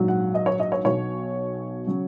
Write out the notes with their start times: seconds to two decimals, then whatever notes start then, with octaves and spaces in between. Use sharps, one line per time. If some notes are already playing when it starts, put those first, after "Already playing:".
Already playing: A#1 G#2 F#3
0.08 F#5
0.34 D#5
0.46 C#5
0.60 D#5
0.72 C#5
0.84 B1 B2 F#3 C#5
1.87 C#3 F#3